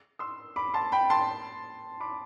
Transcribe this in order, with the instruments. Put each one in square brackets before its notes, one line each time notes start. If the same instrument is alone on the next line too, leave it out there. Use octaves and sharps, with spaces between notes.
[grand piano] C6 E6
B5 D6
A5 C6
G5 B5
A5 C6
B5 D6